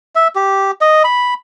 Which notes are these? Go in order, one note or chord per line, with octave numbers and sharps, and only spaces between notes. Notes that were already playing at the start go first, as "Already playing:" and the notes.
E5
G4
D#5
B5